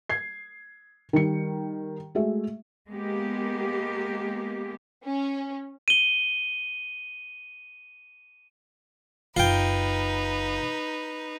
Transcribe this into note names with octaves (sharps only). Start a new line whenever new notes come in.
G#6 C7
D#3 G3 C#7
G#3 A3 F#4 G#4 E5
G#3 A#3 B3 G4
C#4
D#7 G7
F#1 D#4 F4 B4 G5